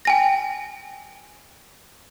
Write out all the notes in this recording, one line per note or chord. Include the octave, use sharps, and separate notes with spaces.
G5 G#5 A#6